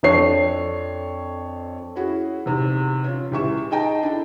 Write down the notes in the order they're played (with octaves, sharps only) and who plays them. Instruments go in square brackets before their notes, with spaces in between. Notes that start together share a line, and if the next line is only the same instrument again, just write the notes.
[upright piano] F2 D4 A4 C#5 C7
[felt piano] C#4 E4 F#4 G#4
E2 C3 D#3
C#4 F4
C#2 E3 G4 E5 C#6 E7
D#4 G#4 D#5 G5 A5 A#5
D4 E4 A4